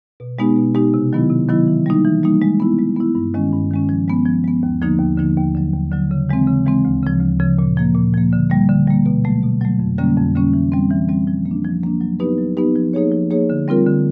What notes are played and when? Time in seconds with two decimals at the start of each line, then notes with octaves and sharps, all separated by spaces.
0.20 B2
0.39 G#3 B3 D#4 G4
0.57 B2
0.75 G#3 B3 D#4 G4
0.94 C3
1.13 D#3 F#3 B3 E4
1.30 C3
1.49 D#3 F#3 B3 E4
1.68 E3
1.86 G3 A#3 D#4
2.05 E3
2.23 G3 A#3 D#4
2.42 G#3
2.60 B3 E4
2.79 G#3
2.96 B3 E4
3.15 G2
3.34 D#3 G#3 C#4
3.53 G2
3.71 D#3 G#3 C#4
3.89 F3
4.08 G#3 B3
4.26 F3
4.44 G#3 B3
4.63 D#2
4.82 D3 F3 A#3 D#4
5.00 D#2
5.18 D3 F3 A#3 D#4
5.37 D#2
5.55 D3 F#3
5.74 D#2
5.92 D3 F#3
6.11 C#3
6.29 E3 G#3 C4
6.47 C#3
6.66 E3 G#3 C4
6.85 D2
7.03 C#3 F3
7.21 D2
7.39 C#3 F3
7.59 A#2
7.77 F3 A#3
7.95 A#2
8.14 F3 A#3
8.33 D3
8.50 G3 A#3
8.69 D3
8.88 G3 A#3
9.06 B2
9.24 F#3 A3
9.43 B2
9.61 F#3 A3
9.80 F2
9.98 D3 G3 A#3 C#4
10.17 F2
10.35 D3 G3 A#3 C#4
10.54 E3
10.72 G3 C4
10.91 E3
11.09 G3 C4
11.27 F3
11.46 A#3
11.51 D4
11.64 F3
11.83 A#3 D4
12.01 F#3
12.19 B3 D#4 G4 B4
12.38 F#3
12.57 B3 D#4 G4 B4
12.75 F3
12.93 A#3 D#4 G#4 C#5
13.12 F3
13.30 A#3 D#4 G#4 C#5
13.50 D3
13.68 G3 C4 F4 A#4
13.86 D3